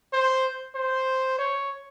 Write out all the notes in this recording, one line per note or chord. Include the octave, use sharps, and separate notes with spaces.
C5
C5
C#5